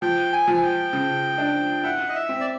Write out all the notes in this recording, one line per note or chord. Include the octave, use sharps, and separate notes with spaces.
F3 G5
G#5
F3
G#5
G5
C#3
D4
E4 F#5
D#5
E5
C4
D5